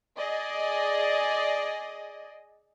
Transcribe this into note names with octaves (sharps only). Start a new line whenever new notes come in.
G#4 D5 D#5